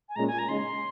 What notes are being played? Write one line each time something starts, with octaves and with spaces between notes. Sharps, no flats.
G#5
A#2 G#3 C#4 A#5
G#5
A#5
C#3 G#3 D#4 C6